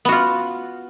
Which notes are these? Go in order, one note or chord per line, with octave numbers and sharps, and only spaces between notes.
B3 F4 F#4